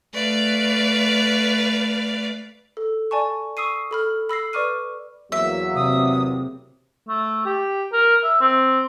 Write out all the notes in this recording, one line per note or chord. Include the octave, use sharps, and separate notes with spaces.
A3 B4 D5 F5
A4
D5 G#5 A5 C#6
C#6 D#6 E6 C7 D#7
A4 B5 F6
B5 E6 A#6 C7
B4 D5 C#6 D6 F6 D#7
E2 F#3 A#3 E5
C3 D#6
A3
G4
A#4
E5
C4